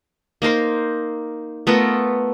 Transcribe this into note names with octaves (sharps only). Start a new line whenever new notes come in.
A#3 D#4 A#4 C5
A3 B3 F4 A#4